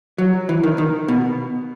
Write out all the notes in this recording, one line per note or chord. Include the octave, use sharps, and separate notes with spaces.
F#3
E3
D#3
D#3
B2